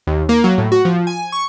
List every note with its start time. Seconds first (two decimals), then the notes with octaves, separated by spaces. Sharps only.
0.07 D#2
0.29 A#3
0.44 F#3
0.58 A2
0.72 F#4
0.85 F3
1.07 G#5
1.32 C#6